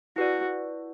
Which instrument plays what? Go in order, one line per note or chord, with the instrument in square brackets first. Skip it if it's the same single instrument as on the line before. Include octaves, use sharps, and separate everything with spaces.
[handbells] E4 B4 D5 [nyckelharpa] F#4